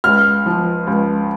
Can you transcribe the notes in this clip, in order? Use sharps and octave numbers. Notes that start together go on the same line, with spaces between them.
C#2 F6
F3
C#2